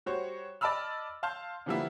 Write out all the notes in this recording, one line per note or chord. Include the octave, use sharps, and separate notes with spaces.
G3 F#4 C5 C#5
D5 D#5 A5 B5 E6 F6
F5 A5 C6 F6 G6
D3 E3 F3 G3 A#3 E4